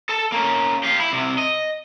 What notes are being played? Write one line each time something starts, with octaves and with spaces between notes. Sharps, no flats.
A4 A5
A#3 C#4
G4 F5
E4
C2 C3
D#5